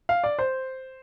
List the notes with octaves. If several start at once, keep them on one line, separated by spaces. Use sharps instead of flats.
F5
D5
C5